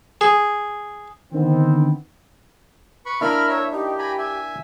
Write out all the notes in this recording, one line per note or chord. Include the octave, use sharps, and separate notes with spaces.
G#4
D3 D#3 B3 C4
B4 B5 C#6
A#3 D4 E4 A#4 E5 B5 F6
C#5 E5
D#4 G4
G#5 A#5 B5
E5 G#5